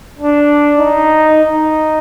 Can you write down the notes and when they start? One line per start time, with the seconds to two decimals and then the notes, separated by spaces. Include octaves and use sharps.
0.19 D4
0.79 D#4
1.40 D#4